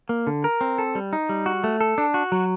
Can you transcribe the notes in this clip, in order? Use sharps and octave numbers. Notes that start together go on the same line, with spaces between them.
A#3
D3
A#4
C4
A4
G3
D#4
G3
F#4
A3
A4
D4
F#4
F#3